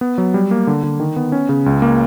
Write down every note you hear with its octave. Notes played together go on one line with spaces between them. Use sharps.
B3
F#3
G3
A#3
D3
D3
D#3
B3
C#4
C#3
C#2
A#3